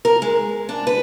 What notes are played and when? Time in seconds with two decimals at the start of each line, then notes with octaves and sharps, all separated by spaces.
0.05 A#4
0.22 G#3
0.69 D4
0.87 B4